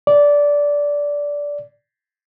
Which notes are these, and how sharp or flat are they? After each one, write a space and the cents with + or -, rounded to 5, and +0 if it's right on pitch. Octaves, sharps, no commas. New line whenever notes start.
D5 -15